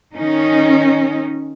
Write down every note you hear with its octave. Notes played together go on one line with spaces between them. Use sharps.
D#3 C#4 D#4